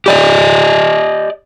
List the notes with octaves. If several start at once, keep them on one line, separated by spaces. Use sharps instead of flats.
G4 D5 D#5